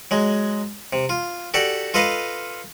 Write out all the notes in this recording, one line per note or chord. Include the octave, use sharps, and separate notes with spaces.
F#3 G#3
C3
F4
F#4 G4 A4 D5
F4 A4 B4 D#5 F5